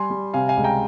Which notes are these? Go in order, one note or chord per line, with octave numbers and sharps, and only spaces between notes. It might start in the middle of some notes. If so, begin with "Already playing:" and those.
Already playing: G3 G#5 C6
G3
C3 F5 G#5
F5 G#5
C#2
G5 A#5